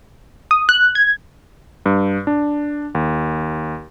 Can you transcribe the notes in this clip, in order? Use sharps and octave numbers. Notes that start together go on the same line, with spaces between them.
D#6
F#6
G#6
G2
D4
D#2